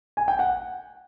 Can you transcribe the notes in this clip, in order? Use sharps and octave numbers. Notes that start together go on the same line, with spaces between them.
G#5
G5
F#5